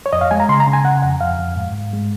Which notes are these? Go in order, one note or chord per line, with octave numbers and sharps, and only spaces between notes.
C#5
F2 D#5
F5
G#3 G#5
A#5
C#3 C6
A#5
C#3
G#5
C#3 F#5
F2 F#5
F2 F5
F2
G#2
G#2
G#3